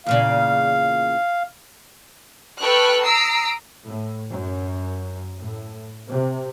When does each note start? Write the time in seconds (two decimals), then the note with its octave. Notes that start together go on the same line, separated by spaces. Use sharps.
0.06 E2 A#2 C#3 F5
2.62 A4 B4 G5 C#6 F6 F#6
3.05 A#5 D#6 E6 C7 D7
3.85 A2
4.31 F#2
5.38 A2
6.07 C3